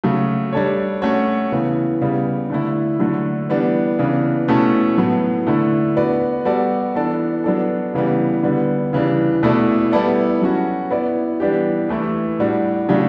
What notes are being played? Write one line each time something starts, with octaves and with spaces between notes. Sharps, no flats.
C#3 F#3 A3
G3 D4 A4 C#5
A3 C#4 F#4 C#5
C#3 E3 B3
C#3 G3 B3
D3 A3 E4
D3 F#3 A3
E3 G3 B3 D4
C#3 E3 B3 D4
B2 A3 C#4 E4 A4
A2 F#3 B3
D3 A3 E4
B3 F#4 B4 D5
G3 B3 F#4 A4 D5
E3 B3 D4 A4 D5
F#3 B3 D4 A4
C#3 E3 G3 B3
D3 G3 B3
C#3 E3 G3 D4
B2 A3 E4 A4 D5
G3 B3 E4 A4 D5
F#3 C#4 F#4
B3 E4 B4 D5
E3 G3 B3 D4 G4
E3 A3 E4
A2 G3 D4 F#4
C#3 F#3 A3 D4 G4